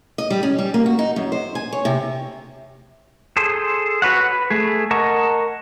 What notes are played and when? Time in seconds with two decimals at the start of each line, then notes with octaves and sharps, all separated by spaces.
0.18 D#5
0.30 G3
0.43 C#4
0.59 G3
0.74 A#3
0.86 F#4
0.99 D#4
1.16 F#2
1.32 C5
1.55 G#5
1.73 C#5
1.85 C3
3.37 G#4 A4 C5
4.02 F#4 B4 C#5 F#5
4.20 B4
4.50 A3 G#4
4.91 A#4 D#5 F#5 A5 C#6